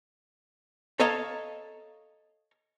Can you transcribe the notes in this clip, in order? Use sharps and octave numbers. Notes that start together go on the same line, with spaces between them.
A4 C#5 D#5 F5 A#5